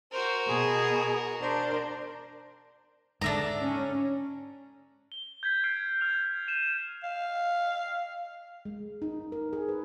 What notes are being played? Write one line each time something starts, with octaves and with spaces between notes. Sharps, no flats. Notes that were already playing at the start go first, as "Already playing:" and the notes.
F#4 A#4 C5
B2 G#4
D4 A#4 C5
G#2 D3 D4 E5 A#5
C#4
G7
G6 G#6 B6
F6 G#6 C7 D7
F6 F7
G6 D#7 E7
F5
G#3
D#4
A#4
G#4
B4